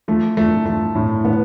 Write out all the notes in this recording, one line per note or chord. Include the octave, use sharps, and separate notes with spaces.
F3 A3
F3 A3
F3 A3
A2
A2 B3